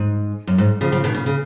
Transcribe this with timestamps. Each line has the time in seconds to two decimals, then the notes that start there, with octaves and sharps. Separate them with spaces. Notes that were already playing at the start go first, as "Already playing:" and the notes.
Already playing: G#2
0.47 F#2
0.58 G#2
0.81 C#3 F3
0.92 C#3 F3
1.04 B2 D#3
1.15 C#3
1.26 C#3